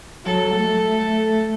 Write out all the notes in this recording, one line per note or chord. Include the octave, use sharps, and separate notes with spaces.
F#3 A4
A3